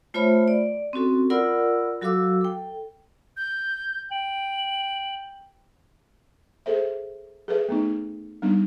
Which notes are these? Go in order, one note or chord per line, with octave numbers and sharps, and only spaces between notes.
A3 F4 C5 C#5 E5 B5
D5
C4 C#4 F#4 A4
F4 A#4 D5 F#5 B5 E6
F#3 F#4 A4 F5 D6 E6
A4 G5
G6
G5 F#7
G#4 A4 C5 E5
G#4 A4 B4 E5
A3 B3 D#4
G3 B3 D4 D#4